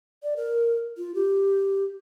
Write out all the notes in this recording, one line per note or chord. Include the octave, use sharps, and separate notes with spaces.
D5
A#4
F4
G4